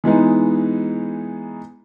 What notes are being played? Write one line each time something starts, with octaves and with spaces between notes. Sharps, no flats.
E3 G#3 B3 D#4